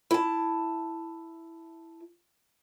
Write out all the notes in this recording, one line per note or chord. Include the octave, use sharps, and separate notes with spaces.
E4 A5